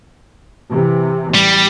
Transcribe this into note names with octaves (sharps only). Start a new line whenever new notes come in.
C3 E3
A1 G3